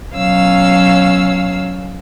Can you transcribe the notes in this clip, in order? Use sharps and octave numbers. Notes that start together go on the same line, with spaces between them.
B2 F#3 C#4 F5 E6